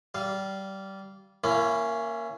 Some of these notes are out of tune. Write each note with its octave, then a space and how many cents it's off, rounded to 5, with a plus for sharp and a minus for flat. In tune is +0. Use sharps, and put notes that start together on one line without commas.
G3 -20 F5 -15
A#3 +0 C#4 +0 E4 +35